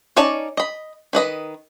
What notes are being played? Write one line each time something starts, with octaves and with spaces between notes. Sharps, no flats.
C#4 D#4 C#5 D5 A5
D#5 B5
D#3 B4 D#5 B5